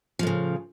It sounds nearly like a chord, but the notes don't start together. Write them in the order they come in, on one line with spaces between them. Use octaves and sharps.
F3 A2 C#3